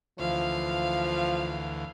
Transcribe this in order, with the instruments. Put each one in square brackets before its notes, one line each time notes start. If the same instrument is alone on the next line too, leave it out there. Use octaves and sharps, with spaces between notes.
[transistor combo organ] D2 E3 [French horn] F3 [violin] F5